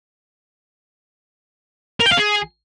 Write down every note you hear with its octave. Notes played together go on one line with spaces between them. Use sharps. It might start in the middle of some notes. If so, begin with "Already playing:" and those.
A#4
G5
F5
G#4